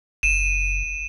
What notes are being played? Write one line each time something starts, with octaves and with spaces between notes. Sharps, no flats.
F#1 D#7 E7